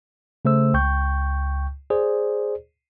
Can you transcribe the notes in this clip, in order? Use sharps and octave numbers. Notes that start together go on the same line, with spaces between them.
C#3 A3 C5 E6
C#2 G5 C#6 G6
G#4 C5 D5